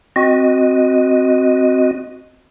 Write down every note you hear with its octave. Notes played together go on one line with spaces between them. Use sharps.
C4 F#4 D#5